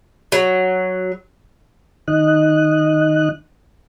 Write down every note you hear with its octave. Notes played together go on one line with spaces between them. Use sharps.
F#3
D#3 D#4 D#5 F#6